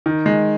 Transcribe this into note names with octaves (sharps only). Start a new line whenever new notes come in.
D#3
G#3